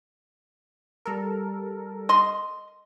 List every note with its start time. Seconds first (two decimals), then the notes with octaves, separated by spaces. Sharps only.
1.06 G3 A4 A#4
2.09 D#5 C6